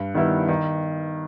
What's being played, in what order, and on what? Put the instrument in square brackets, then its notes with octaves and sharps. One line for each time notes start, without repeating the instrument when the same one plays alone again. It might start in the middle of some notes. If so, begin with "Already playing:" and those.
Already playing: [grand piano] G2
D#3 G3 B3 E4
D#3